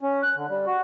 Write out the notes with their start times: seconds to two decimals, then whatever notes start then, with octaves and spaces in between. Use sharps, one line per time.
0.01 C#4
0.23 F#6
0.36 D3
0.49 G3
0.67 F#4